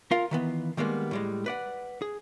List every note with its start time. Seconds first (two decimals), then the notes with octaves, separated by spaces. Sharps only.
0.11 F4 A#4 F5
0.31 D#3 E3 B3
0.77 D#3 G3 G#3 A#3 B3
1.11 A2 G3 G#3
1.46 B4 D5 F#5
2.02 G#4